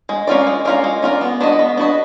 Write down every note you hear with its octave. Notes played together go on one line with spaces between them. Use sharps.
G#3
C#4 F4 A#4 D5
G#3
C#4 F4 A#4 D5
G#3
C#4 F4 A#4 D5
B3
D4 F#4 B4 D#5
B3
D4 F#4 B4 D#5